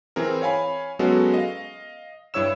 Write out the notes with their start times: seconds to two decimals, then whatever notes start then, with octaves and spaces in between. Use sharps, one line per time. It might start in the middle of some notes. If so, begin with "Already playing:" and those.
0.16 E3 C4 G#4 A#4
0.42 C#5 F5 G#5 B5
0.99 F#3 G#3 B3 C#4 F#4 A4
1.34 D#5 F5
2.34 G2 E4 C#5 E6 E7